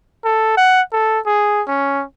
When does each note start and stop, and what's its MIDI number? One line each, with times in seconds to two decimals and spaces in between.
0.25 0.55 69
0.57 0.81 78
0.93 1.20 69
1.26 1.62 68
1.68 2.04 61